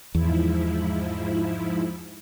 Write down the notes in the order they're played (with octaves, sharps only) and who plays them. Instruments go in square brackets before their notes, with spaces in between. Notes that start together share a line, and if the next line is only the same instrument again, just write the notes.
[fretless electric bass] E2 [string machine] G#2 F3 E4